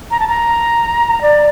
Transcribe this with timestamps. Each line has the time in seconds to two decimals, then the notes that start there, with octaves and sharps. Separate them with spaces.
0.11 A#5
0.20 A5
0.28 A#5
1.22 D5